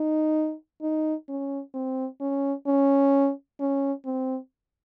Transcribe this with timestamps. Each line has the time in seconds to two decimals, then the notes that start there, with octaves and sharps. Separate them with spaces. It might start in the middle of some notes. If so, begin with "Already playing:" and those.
Already playing: D#4
0.82 D#4
1.29 C#4
1.74 C4
2.21 C#4
2.66 C#4
3.60 C#4
4.05 C4